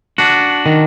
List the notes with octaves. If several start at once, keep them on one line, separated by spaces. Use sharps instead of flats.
D4 F#4
D#3